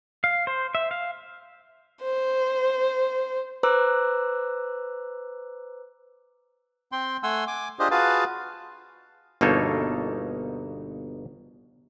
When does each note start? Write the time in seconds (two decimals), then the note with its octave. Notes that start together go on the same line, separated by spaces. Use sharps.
0.24 F5
0.47 C5
0.75 E5
0.91 F5
2.03 C5
3.63 B4 C5 A#5 D6 E6 F#6
6.92 C4 G5 C6
7.23 A3 F#5 G#5 C6 E6
7.47 G#5 D6
7.79 D4 F4 G4 G#4 C5 D#5
7.91 F4 F#4 G#4 B4 F5 A5
9.41 G1 B2 A#3 D#4 A4 C#5